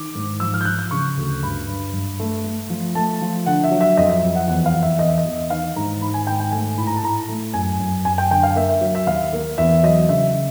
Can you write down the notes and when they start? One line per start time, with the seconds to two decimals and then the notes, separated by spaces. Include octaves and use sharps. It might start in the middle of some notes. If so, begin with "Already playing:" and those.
Already playing: D#3 D6
0.15 G#2
0.40 F3 E6
0.54 F6
0.61 G6
0.65 F3 F#6
0.79 G6
0.91 C#3 C#6
1.17 D2
1.43 G2 B5
1.69 G2
1.93 G2
2.20 A3
2.44 A3
2.70 F3
2.95 A3 A5
3.21 F3
3.46 D3 F#5
3.64 E5
3.71 F#3
3.81 E5
3.97 F2 D#5
4.10 E5
4.23 F2
4.35 F#5
4.48 E2 F#5
4.66 F5
4.74 E2
4.82 E5
4.99 E2 D#5
5.09 E5
5.18 D#5
5.25 E2
5.50 D#3 F5
5.76 G#2 A#5
6.01 D#3 B5
6.14 G#5
6.27 G#2 G5
6.40 G5
6.52 A3 G#5
6.78 A2 B5
6.87 A#5
6.96 A5
7.03 A2 A#5
7.28 A3
7.54 F#2 G#5
7.80 F#2
8.05 F#2 G#5
8.18 G5
8.31 D3 G5
8.43 F5
8.56 A#3 E5
8.69 E5
8.81 F#3
8.95 E5
9.07 D#2 F5
9.33 A#3
9.58 E2 E5
9.83 F#3 D#5
10.09 C#3 E5